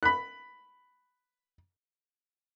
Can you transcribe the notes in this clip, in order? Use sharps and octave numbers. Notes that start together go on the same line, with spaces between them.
B5 F#6